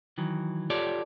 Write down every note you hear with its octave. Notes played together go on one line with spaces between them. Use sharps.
D#3 E3 F#3
F4 G4 A4 C#5 D5